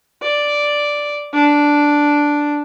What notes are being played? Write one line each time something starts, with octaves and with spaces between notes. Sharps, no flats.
D5
D4